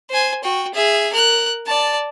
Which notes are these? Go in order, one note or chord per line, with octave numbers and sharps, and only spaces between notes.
C5 G#5
F#4 G5
G#4 E5
A#4 F#6
D5 A5